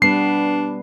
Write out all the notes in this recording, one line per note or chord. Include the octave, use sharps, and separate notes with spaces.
G3 B3 D4 B4 C7